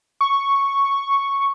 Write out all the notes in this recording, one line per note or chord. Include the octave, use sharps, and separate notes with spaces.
C#6